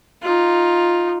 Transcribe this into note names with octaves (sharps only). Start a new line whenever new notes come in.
D#4 F4